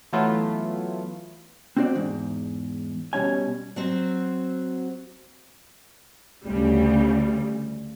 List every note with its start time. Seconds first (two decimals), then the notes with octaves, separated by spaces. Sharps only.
0.13 E3 F#3 A3 B3 E4 F4
1.77 C4 D4 F#4 C5 D5
1.95 E2 G#2
3.13 B2 G3 C#4 C#5 G#5
3.76 F#3 C4 F#4
6.45 D2 C#3 G3